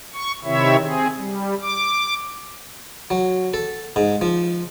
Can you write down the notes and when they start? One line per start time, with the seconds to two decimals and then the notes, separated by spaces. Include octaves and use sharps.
0.14 C#6
0.44 C3 D#3 C4 E4 C#5 E5
0.81 C4 G#4
1.18 G3
1.62 D6
3.10 F#3
3.54 A4
3.96 G#2
4.21 F3